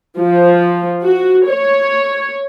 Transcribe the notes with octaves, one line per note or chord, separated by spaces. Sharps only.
F3
F#4
C#5